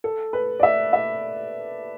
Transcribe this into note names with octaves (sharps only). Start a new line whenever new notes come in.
A4
B4
D5
E5
E5